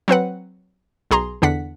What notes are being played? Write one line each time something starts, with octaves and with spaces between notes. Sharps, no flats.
F#3 C4 B4 F#5
B1 G#4 A#5 C6
E2 D3 D4 F#5 B6